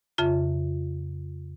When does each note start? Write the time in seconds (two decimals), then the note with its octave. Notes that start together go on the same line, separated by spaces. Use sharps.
0.18 F2 C#3 F4 E5